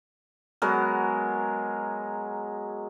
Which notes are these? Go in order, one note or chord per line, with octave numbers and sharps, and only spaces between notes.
F#3 G#3 B3 A#4